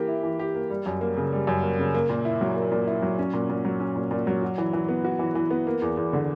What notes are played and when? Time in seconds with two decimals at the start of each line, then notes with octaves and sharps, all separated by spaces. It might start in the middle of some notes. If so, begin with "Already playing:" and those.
Already playing: E3 A#3 G4
0.08 E4
0.23 E3
0.39 G4
0.55 A#3
0.70 G3
0.86 F#2
1.01 A#3
1.17 C#3
1.33 G3
1.47 F#2
1.63 A#3
1.79 C#3
1.95 A#3
2.09 A#2
2.25 E4
2.41 F#3
2.56 A#3
2.72 A#2
2.87 E4
3.02 F#3
3.19 C#4
3.33 A#2
3.49 A#2
3.65 F#3
3.80 C#4
3.96 A#2
4.11 A#2
4.27 F#3
4.43 F#4
4.58 E3
4.73 E3
4.88 B3
5.04 F#4
5.19 E3
5.35 E3
5.51 B3
5.67 A#3
5.82 E2
5.97 E2
6.13 D3